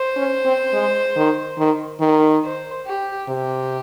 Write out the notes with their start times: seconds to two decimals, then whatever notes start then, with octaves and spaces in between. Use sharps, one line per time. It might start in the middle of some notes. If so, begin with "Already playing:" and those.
Already playing: C5
0.17 C#4
0.45 C4
0.73 G#3
1.16 D#3
1.58 D#3
2.00 D#3
2.43 C5
2.85 G4
3.28 C3 G4